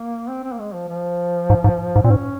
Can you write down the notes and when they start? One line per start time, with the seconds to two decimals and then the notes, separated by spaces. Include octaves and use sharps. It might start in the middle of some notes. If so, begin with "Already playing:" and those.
Already playing: A#3
0.28 C4
0.43 C4
0.52 A#3
0.59 G#3
0.74 F3
0.88 F3
1.50 G#2
1.64 G#2
1.96 G#2
2.04 A#2 C4
2.10 G#2 C#4